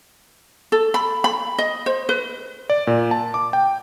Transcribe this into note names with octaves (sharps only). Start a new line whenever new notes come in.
A4
B5
B5
D#5
C5
B4
D5
A#2
A5
D6
G5